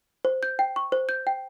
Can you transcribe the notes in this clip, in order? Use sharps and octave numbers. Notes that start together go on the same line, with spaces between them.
C5
G6
G5
C#6
C5
G6
G5